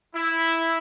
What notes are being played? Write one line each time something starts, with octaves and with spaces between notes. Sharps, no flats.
E4